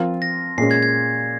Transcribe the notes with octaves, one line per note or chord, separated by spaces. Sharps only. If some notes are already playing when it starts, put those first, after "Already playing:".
Already playing: F3 C4 F4 A#4
A#6
A#2 G#3 C#4 C7
G#6
G#6